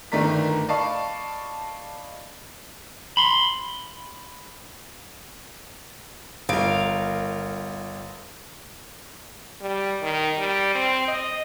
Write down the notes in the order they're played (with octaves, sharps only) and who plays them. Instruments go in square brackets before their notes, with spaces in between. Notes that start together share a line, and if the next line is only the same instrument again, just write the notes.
[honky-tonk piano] G1 D#3 A3 D5 A#5 B6
D5 D#5 F5 A5 B5 C#6
[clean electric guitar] B5 C6
[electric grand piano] G1 D7 [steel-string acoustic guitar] A#4 F5
[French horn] G3
D#3
G3
C4
D#5